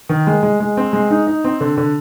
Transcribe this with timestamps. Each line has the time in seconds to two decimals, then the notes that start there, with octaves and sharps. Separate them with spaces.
0.09 D#3
0.27 G#3
0.43 G#3
0.60 G#3
0.77 C4
0.93 G#3
1.11 D#4
1.27 D#4
1.44 C4
1.61 D3
1.77 D3